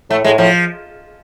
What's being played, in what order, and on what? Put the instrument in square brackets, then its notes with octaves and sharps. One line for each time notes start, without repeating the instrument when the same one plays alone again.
[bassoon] A2 [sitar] A3
[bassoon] A2 [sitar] G#3
[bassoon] A2 [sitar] F3